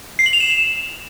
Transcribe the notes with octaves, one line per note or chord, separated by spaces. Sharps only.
C7
F#7
F7
E7